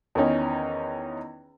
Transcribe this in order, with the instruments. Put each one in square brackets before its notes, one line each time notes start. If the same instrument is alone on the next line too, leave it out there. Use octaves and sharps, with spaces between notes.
[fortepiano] E2 D#3 C#4 D#4